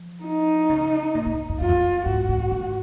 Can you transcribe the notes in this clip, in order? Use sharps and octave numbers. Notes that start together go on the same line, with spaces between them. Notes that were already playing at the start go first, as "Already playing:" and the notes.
Already playing: F3
D#4
C#3
A#2
A#2
F#2
F#2 F4
F2
F#2
G#2 F#4
G#2
G#2